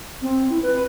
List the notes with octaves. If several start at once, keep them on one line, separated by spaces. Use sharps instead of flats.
C4
E4
B4